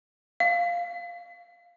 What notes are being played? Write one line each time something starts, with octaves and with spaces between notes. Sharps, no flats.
F5